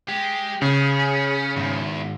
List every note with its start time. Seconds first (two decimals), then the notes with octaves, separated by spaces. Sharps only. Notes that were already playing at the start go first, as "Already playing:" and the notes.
0.08 G#3 G4
0.62 C#3 C#4 G#4
1.56 E2 G#2 D#3